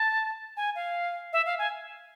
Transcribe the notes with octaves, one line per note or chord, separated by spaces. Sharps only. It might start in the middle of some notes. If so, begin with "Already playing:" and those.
Already playing: A5
G#5
F5
E5
F5
G#5